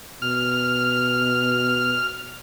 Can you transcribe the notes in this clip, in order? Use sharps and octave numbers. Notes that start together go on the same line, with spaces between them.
B2 F6